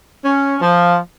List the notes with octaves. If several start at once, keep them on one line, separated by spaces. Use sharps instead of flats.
C#4
F3